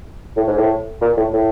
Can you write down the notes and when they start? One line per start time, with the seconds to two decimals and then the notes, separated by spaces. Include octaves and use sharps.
0.37 A2
0.48 G#2
0.58 A2
1.01 A#2
1.17 A2
1.33 A2